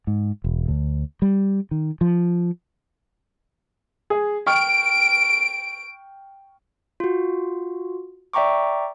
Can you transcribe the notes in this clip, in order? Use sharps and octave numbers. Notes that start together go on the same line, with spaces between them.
G#2
E1
D2
G3
D#3
F3
G#4
G5 C#6 F6 D7
F4 F#4
D5 E5 G5 A#5 C#6 D6